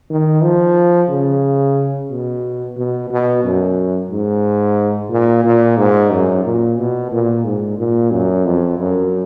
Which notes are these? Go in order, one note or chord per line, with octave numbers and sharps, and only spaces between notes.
D#3
F3
C#3
B2
B2
B2
F#2
G#2
A#2
A#2
G#2
F#2
A#2
B2
A#2
G#2
A#2
F#2
F2
F#2